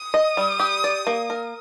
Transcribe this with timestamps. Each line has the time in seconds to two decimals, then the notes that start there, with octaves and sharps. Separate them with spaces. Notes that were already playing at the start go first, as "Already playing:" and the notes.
Already playing: D#6
0.14 D#5
0.37 G3
0.60 G4
0.84 D5
1.07 A#3
1.30 A#4